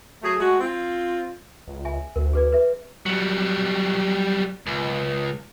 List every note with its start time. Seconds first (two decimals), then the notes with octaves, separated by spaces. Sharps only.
0.23 F#3 A3 G#4
0.39 G#3 A3 F#4
0.60 C4 F4
1.68 C#2
1.85 E5 G#5
2.16 D2 A#4
2.33 G#4 B4 D5
2.52 B4 E5
3.06 F#3 G3
4.67 C#2